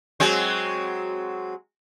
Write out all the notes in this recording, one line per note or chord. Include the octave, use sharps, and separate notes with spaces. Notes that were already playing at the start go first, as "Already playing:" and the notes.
F#3 G#3 C4